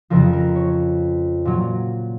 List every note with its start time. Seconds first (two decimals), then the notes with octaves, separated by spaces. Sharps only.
0.10 F2 C#3 F3 A#4
0.33 A#4
0.56 C#5
1.45 A#2 F#3